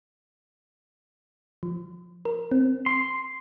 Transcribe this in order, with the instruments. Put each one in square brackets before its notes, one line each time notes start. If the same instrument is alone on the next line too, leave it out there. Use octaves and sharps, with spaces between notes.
[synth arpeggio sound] F3
A#4
C4
[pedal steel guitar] C6